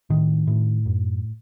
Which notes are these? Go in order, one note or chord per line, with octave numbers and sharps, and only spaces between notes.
A2 D#3
A2
F#2